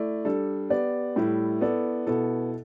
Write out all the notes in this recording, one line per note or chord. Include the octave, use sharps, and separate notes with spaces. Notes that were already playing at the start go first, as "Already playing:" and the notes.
Already playing: A3 E4 D5
G3 D4 A4
B3 G4 D5
A2 G3 E4
B3 E4 A4 D5
B2 B3 E4 A4